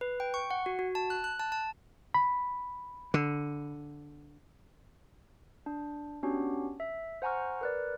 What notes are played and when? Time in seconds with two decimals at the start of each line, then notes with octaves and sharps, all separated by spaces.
0.01 B4
0.20 G5
0.34 C#6
0.51 F#5
0.66 F#4
0.79 F#4
0.95 A5
1.10 F#6
1.24 F#6
1.40 A5
1.52 A5
2.14 B5
3.14 D3
5.66 D4
6.23 B3 C#4 D4 F#4 G4
6.80 E5
7.22 C5 F#5 G#5 A#5 C#6 F6
7.61 A#4 B4 D5